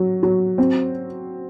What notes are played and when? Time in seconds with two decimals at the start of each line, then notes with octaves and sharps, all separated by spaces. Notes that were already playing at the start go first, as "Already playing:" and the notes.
Already playing: F#3
0.23 F#3
0.58 C4